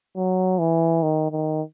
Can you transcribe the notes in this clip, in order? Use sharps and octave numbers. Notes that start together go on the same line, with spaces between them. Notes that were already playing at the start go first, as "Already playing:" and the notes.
F#3
E3
D#3
D#3